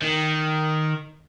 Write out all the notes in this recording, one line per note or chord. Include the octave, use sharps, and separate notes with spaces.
D#3